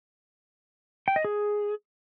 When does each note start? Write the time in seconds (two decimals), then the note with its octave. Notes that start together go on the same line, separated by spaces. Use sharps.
1.08 G5
1.16 D#5
1.25 G#4